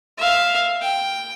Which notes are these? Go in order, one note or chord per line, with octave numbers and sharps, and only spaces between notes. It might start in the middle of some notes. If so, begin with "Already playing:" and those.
E5 F5
G5